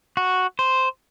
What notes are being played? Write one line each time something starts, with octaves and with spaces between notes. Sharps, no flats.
F#4
C5